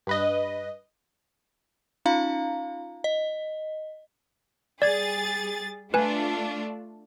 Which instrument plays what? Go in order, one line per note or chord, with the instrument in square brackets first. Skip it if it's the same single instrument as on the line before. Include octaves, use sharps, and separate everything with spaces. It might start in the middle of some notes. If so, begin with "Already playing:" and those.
[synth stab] G2 B4 D#5
[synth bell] C#4 D#4 F4 F5 A#5
D#5
[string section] G3 G#4 A6 [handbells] D5 G#6
[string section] A3 D4 F4 [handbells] B4 G#5